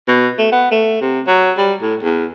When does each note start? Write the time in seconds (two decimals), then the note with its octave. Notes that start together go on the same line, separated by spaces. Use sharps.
0.08 B2
0.38 A3
0.52 B3
0.72 A3
1.01 C3
1.27 F#3
1.57 G3
1.82 A2
2.02 E2